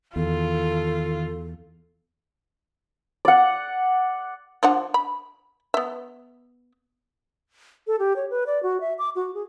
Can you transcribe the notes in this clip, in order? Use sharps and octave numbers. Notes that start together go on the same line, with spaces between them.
E2 D#3 F4 A4
D5 F#5
F3 D4 F#5
B5
B3 E5
A4
G4
C#5
B4
D5
F#4
E5
D6
F#4
G#4